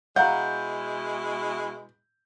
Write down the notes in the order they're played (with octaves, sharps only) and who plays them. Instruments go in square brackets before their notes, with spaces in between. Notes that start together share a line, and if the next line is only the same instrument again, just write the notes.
[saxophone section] B2 G#3 E4 [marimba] F5 A#5 [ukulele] F#5 [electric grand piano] G6